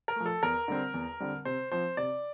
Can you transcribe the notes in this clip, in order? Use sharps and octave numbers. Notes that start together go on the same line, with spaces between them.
A#4
F3 A3
A4
E2 A#4
D3 G3 C4
E2
D3 G3 C4
C3 C5
F3 C4 C5
C3 D5